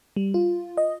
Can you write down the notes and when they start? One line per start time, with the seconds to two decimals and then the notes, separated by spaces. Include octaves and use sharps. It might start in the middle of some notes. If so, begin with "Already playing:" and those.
0.16 G3
0.34 F4
0.77 D#5